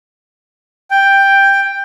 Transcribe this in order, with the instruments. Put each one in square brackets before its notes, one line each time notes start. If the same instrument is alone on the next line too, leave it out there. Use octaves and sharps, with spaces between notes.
[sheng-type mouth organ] G5